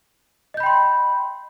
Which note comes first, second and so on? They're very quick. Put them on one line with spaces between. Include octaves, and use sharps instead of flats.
D#5 G6 B5 G5 C6